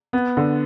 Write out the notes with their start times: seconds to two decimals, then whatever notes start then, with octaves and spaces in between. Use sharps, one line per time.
0.13 B3
0.37 D3